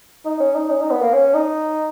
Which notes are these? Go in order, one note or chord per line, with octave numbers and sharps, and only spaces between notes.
D#4
C#4
D#4
C#4
D#4
B3
A#3
C#4
D#4